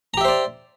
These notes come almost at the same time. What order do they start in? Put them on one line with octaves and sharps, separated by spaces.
A#5 G4 E5 C5 D5